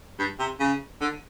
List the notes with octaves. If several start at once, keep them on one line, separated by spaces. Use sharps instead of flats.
G2
C3
C#3
D3